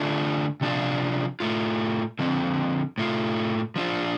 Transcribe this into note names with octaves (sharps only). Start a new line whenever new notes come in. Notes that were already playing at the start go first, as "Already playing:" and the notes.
Already playing: D3 A3 D4 F4
C3 F3 D4 F4
A2 A3 F4
D3 F3 C4
A2 A3 F4
F3 D4 F4